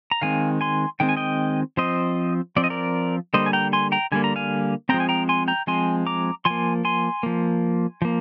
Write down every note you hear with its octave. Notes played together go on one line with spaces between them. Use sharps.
A#5
D#3 G#3 C4 F5 G#5
G#5 C6
D#3 G#3 C4 G5
G#5
D#5 G5
F3 C4 C5 D#5
F3 C4 D5
D#5
A#4 D5
D3 G3 A#3 C5 D#5
G#5
G5 A#5
G#5 C6
G5 A#5
D3 G3 A#3 G#5
A#5
F5 G#5
F3 G#3 C4 G5 A#5
G#5
G5 A#5
G#5 C6
G5 A#5
F3 G#3 C4 G#5 C6
A#5 D6
F3 A#3 G#5 C6
G#5 C6
F3 A#3
F3 A#3